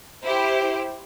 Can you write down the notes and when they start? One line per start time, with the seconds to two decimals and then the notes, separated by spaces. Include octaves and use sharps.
0.24 E4 G4 C5